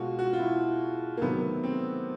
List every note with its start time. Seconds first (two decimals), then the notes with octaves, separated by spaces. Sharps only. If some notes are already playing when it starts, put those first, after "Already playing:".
Already playing: B2 G#3 F4 F#4
0.19 F#4
0.33 F4
0.40 E4
1.17 A#3
1.22 C3 D#3 F#3 A3 B3
1.63 C4